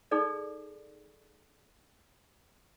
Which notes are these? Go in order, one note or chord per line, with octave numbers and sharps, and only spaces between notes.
D#4 G#4 A4 D5